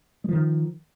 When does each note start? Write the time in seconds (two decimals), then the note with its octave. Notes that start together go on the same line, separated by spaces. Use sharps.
0.24 G#3
0.29 F3
0.33 D#3